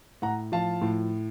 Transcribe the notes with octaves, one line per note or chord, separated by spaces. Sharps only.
A2 F#5 A#5
F3 F5 A5
A2